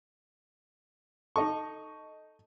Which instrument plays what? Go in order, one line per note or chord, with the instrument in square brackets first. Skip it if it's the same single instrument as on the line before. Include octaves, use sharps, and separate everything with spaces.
[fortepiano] D#4 D#5 C#6 [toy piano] A4 A5